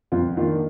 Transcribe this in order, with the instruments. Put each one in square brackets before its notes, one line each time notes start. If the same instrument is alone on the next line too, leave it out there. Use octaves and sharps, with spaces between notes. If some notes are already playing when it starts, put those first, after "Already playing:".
[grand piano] F2 F4
D#3 A#3 D4 F4